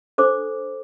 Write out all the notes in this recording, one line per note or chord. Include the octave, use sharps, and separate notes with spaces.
D4 A4 C5 D6